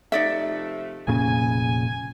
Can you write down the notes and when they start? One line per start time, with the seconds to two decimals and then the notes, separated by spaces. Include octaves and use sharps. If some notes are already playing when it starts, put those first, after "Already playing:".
0.12 C3 F3 A3 D#4 D5 E5
1.08 F1 A#2 C#3 G#5